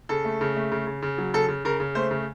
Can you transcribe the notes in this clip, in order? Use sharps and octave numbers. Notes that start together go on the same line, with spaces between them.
C#3 A4
A3
C#3
A3
C#3
C#3
C#3
F#3
C#3 A4
C#3
C#3 A#4
C#3
A3 C5
C#3